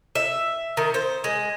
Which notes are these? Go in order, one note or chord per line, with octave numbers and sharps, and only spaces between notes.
E5
D#3
C5
G#3